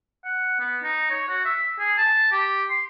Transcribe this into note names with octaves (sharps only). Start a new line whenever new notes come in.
F#5
B3
D#4
C#5
F#4
E5
G#4
A5
G4
C6